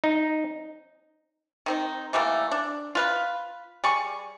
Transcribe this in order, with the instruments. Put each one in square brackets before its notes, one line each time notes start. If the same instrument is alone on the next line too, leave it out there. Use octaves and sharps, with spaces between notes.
[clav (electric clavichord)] D#4
[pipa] D#3 C4 D#4
E3 G3 A3 A#3
D4
F4 B4 F5
G3 G#4 C#6